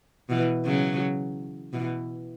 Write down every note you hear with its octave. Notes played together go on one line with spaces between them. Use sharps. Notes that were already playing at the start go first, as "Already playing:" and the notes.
B2 E3
C#3 F#3
B2 E3